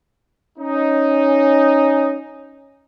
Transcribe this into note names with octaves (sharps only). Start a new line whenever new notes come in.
C#4 D#4